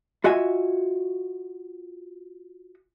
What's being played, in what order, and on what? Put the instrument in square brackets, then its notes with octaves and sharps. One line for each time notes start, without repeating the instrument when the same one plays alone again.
[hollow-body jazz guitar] F4 F#4 D#5 E5 G#5